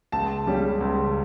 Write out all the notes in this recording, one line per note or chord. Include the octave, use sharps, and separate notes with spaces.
C#2 A5
C#3 G3 C#4
C#2